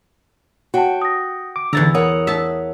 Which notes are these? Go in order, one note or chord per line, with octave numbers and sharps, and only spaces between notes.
F#4 C#5 F#5 G5 A5
D#6 A#6
D6
E2 D3 E4 A#5 E6 A6
A#4 C#5 F#5 D#6
E5 A5